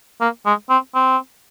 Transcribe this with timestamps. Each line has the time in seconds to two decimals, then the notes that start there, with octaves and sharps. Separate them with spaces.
0.21 A#3
0.46 G#3
0.70 C4
0.95 C4